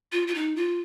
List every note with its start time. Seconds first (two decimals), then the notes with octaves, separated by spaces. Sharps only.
0.12 F4
0.27 F4
0.34 D#4
0.56 F4